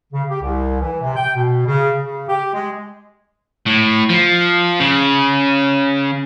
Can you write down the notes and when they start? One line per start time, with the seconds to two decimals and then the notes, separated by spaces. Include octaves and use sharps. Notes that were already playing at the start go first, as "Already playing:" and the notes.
0.12 C#3
0.30 G4
0.42 C2
0.80 E3
1.01 C3
1.16 G5
1.36 B2
1.66 C#3
2.02 C#3
2.29 G4
2.54 G#3
3.66 A2
4.09 F3
4.80 C#3